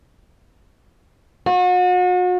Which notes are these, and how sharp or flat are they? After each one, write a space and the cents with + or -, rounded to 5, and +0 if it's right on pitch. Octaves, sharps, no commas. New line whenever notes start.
F#4 -40